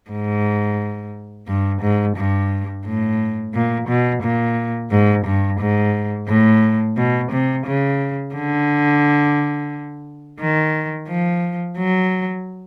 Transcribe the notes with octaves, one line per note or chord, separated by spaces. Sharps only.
G#2
G2
G#2
G2
A2
A#2
B2
A#2
G#2
G2
G#2
A2
B2
C3
C#3
D3
D#3
F3
F#3